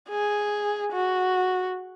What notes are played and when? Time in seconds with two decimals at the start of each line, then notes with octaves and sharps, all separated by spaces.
0.10 G#4
0.92 F#4